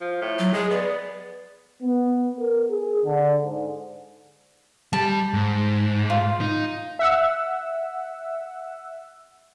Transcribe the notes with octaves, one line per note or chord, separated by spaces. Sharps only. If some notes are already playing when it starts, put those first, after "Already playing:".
F3
A2
F#3
G#3 G#4
B3 D5
B3
A#4
G#4
D3
G#2
G3 A5
G#2
F4
D#4
E5 F#5 E6